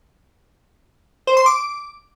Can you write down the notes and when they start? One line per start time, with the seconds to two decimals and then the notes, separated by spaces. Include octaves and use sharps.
1.27 C5
1.37 C6
1.46 D6